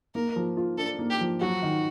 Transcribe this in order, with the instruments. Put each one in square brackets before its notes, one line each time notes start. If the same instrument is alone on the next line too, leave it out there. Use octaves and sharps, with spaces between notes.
[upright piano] A#3 [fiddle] A#4
[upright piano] F3
F4
[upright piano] D4 [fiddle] A4
[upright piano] A#3
[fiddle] G4
[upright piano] F3
[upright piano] F#3 [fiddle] F#4
[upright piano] D#3